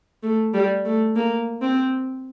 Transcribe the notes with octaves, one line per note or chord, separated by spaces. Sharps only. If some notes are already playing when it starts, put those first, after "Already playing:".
A3
G3
A3
A#3
C4